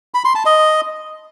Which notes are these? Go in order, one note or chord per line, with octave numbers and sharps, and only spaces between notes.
B5
C6
A5
D#5